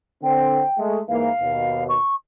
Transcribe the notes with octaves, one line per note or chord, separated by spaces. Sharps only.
D3 C4 G5
G#3 A3
G#2 E3 A#3 F5
D#2 B2
C#6